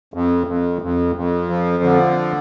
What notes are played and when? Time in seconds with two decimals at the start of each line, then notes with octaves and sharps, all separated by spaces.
0.14 F2
0.47 F2
0.82 F2
1.16 F2
1.50 F3
1.83 D3